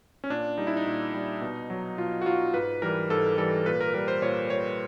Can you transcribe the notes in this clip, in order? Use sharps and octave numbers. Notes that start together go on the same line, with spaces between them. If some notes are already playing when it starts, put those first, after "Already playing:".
C#4
A#2 D4
G3 D#4
E4
D#4
A#2
G3
B2
F#3
B2 F4
F#4
F#3 F4
G#2 B4
E3 G3 A#4
G#2 A4
E3 G3 A4
A#2 B4
A#4
G3 A#4
C5
A#2 C#5
G3 C#5